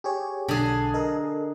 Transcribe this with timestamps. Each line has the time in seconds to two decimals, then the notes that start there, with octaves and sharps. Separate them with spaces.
0.04 G4 G#4 C#5
0.48 B1 D3 G#4
0.94 A4 A#4 D#5